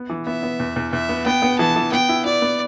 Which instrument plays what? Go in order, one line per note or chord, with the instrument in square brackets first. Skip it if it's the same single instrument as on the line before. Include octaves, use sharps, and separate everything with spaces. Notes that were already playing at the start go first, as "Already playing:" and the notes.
Already playing: [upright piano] B3
E3
[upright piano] B3 [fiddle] E5
[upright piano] B3
E2
E2
[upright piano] E2 [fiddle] E5
[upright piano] B3
[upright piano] B3 [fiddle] G5
[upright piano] B3
[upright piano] E3 [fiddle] A5
[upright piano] E3
[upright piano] B3 [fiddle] G5
[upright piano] E4
[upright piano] E4 [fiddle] D5
[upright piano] B3